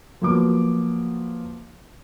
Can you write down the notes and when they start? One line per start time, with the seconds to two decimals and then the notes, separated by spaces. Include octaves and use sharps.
0.21 F3 F#3 A#3 B3 D6